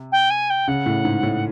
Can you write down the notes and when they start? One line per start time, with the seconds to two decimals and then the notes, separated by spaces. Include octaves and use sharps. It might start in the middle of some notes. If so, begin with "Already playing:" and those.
Already playing: C3
0.12 G5
0.30 G#5
0.50 G5
0.68 C#3 F#5
0.86 A2
1.05 G#2
1.23 A2